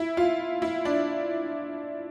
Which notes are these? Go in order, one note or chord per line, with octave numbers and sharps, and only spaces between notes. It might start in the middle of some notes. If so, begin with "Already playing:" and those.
Already playing: E4
F4
E4
D4